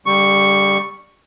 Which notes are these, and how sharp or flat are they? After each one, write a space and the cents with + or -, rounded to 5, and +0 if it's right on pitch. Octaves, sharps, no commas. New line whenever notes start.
D3 -35 G3 +10 C#6 +0